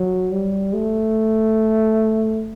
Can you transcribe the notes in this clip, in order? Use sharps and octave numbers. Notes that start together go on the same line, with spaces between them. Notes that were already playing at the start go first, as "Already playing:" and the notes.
Already playing: F#3
G3
A3